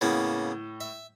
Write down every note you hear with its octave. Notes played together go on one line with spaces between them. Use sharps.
A2 C#3 A#3 B3
E5